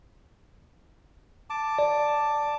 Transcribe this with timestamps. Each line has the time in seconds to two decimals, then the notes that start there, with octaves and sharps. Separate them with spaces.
1.50 A5 D6
1.79 D5